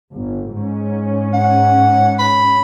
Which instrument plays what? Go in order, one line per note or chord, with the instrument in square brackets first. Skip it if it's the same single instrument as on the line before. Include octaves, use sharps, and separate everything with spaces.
[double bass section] G1
G#2 C#4
[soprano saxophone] F#5
B5